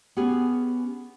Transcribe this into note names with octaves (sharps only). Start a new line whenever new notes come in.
B3 C#4 G4 G#4